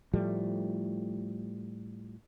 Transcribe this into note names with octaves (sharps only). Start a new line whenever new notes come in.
A2 F3 G3 A3